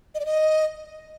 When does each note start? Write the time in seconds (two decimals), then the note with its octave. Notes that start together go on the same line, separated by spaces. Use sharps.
0.15 D#5
0.20 D5
0.25 D#5